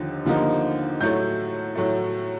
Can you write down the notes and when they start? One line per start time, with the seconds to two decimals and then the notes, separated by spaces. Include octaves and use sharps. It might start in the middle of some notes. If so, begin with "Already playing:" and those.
Already playing: D#2 D3 F3 D#4
0.25 D#2 D3 F3 A#3 D#4
1.01 A2 F#3 A3 G6
1.76 A2 F#3 A3